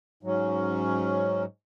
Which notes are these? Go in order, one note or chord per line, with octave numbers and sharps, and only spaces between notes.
G#2 F#3 C#4